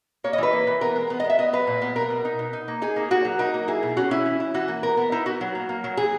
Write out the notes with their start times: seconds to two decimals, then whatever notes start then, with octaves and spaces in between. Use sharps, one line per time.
0.24 A#3 C#5
0.33 D#5
0.38 E3 B4
0.53 A#3
0.67 E3
0.81 B3 A#4
0.95 G#3
1.10 B3
1.20 D#5
1.24 B3
1.30 E5
1.38 B3 D#5
1.53 F#3 B4
1.67 A#2
1.82 B3
1.96 B2 A#4
2.10 B2
2.25 D#4
2.39 B2
2.53 D#4
2.68 A#3
2.82 D#4 G#4
2.96 A#3
3.11 A#3 F#4
3.25 F#3
3.39 D#4 A#4
3.54 A#3
3.68 E4 G#4
3.83 B2
3.97 C#4 F#4
4.11 C#4 E4
4.26 E3
4.40 E4
4.54 E3 F#4
4.68 A#3
4.83 B3 A#4
4.97 B3
5.12 D#4 E4
5.26 B3 F#4
5.41 F#3
5.55 A#3
5.69 A#3
5.84 F#3
5.97 E3 G#4